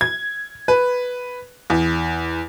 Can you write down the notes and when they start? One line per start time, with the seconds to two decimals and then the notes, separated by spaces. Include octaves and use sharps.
0.01 G#6
0.68 B4
1.70 E2